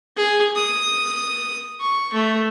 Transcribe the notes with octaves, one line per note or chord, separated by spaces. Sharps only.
G#4
D#6
C#6
A3